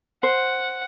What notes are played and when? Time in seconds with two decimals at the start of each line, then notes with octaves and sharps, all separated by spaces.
0.23 C5 F#5